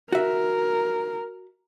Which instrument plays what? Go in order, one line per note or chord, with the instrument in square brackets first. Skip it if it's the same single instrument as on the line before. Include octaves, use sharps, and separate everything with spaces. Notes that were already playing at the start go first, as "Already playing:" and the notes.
[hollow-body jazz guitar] F#4 E5 [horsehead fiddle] A#4